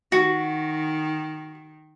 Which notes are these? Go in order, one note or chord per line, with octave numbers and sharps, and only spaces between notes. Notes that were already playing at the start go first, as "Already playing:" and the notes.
D#3 F#4